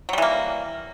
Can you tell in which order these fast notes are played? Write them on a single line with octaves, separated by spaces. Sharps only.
F#3 G3 E3 A#3